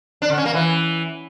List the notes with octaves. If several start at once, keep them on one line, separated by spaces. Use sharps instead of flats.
D4
D3
C#4
A#3
E3